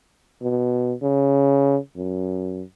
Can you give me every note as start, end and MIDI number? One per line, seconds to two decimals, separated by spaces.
0.42 0.94 47
1.03 1.77 49
1.97 2.63 42